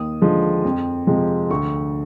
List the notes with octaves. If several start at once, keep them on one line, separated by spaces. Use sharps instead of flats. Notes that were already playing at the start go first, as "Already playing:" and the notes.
Already playing: D#2 D#6
D3 F3 G#3
F2
C3 F3 G#3
D2 C#6